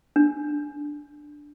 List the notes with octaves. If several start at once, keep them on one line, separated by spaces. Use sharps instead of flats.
D4